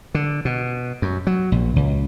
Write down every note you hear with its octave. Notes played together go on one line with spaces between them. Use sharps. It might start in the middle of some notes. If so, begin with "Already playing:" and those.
D3
B2
F#2
F#3
A#1
C#2